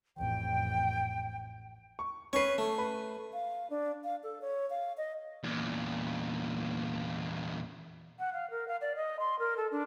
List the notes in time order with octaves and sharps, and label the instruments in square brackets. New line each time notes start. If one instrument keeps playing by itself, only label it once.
[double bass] A1 F2 [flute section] G5
[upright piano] C#6
[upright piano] C#4 C#6 C7 [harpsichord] B4 C#5
[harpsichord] A3
[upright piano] B4
[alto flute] F5
D4
F5
A4
C#5
F5
D#5
[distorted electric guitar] E2 A#2
[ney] F#5
F5
A#4
F5
D5
D#5
C6
A#4
A4
D4